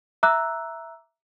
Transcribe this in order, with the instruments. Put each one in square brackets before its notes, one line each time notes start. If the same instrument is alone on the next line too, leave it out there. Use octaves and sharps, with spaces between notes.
[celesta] E5 A#5 D6 E6 F#6